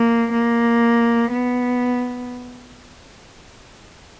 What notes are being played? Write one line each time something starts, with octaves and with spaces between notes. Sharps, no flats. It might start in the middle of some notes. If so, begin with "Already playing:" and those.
Already playing: A#3
A#3
B3